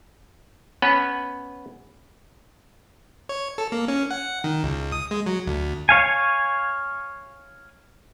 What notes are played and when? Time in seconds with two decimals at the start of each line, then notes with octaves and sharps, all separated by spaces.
0.82 B3 C#4 B4
3.29 C#5
3.58 A4
3.72 A#3
3.88 C#4
4.11 F#5
4.44 D#3
4.63 C#2
4.92 D#6
5.11 G#3
5.26 F#3
5.47 D2
5.89 C#5 F5 G#5